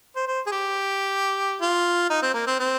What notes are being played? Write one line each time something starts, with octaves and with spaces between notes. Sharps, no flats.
C5
C5
G#4
G4
F4
D#4
C4
A#3
C4
C4